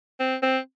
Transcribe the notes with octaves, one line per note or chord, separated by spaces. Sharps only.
C4
C4